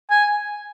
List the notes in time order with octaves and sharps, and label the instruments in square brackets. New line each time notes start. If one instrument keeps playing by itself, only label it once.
[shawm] G#5